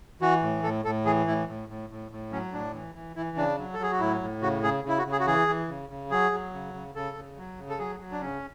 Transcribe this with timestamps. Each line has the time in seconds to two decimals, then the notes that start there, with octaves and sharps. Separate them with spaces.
0.21 E3 F#4
0.42 A2
0.63 A2 A4
0.84 A2 A4
1.05 E3 G#4
1.27 A2 E4
1.48 A2
1.69 A2
1.90 A2
2.11 A2
2.32 F#3 C#4
2.53 A2 D4
2.74 E3
2.95 E3
3.16 E3 E4
3.37 C#3 D4
3.58 F#3
3.74 A4
3.79 F#3 G#4
3.92 F#4
4.00 A2 E4
4.21 A2
4.42 C#3 F#4
4.63 C#3 G#4
4.84 C#3 E4
4.99 F#4
5.06 C#3
5.12 G#4
5.20 F#4
5.26 E3 G#4
5.48 E3
5.68 C#3
5.90 C#3
6.11 F#3 G#4
6.32 F#3
6.53 C#3
6.74 C#3
6.95 C#3 A4
7.16 C#3
7.37 F#3
7.58 C#3
7.69 A4
7.79 F#3 G#4
8.00 F#3
8.12 D4
8.21 C#3 C#4